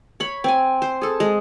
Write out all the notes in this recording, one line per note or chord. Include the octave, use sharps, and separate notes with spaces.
C#5 B5
C4 G#5
C5
G#4 A4
G#3